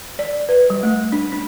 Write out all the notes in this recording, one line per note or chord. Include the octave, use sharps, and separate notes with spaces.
D5
B4
G3
A3
D4
D4